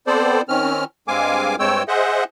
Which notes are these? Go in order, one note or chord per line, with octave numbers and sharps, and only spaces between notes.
B3 C4 A4 C5 D5
D#3 C4 C#4 F6
G2 G#3 C4 F5 G#5 D6
G2 G#3 C4 C#5 G5 E6
G#4 C5 D#5 E5 F#5